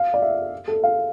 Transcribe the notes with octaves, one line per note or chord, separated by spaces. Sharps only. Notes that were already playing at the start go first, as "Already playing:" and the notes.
Already playing: F5
D5
E5
A4
F5